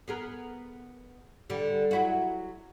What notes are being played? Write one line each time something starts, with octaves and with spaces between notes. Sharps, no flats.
B3 G#4 A#4
D3 G3
F#3 E4 F#4